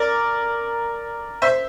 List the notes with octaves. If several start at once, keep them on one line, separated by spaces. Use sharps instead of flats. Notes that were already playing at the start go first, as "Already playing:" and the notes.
Already playing: A#4 D5
C5 E5